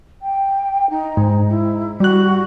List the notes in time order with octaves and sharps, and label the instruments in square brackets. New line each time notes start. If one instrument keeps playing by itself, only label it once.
[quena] G5
D#4
[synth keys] G#2
[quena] E4
[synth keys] G3 F#6 [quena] F#4